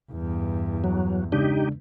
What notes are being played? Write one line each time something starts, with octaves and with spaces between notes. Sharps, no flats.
E2 G2
F#3
C#3 G#3 D4 D#4 G4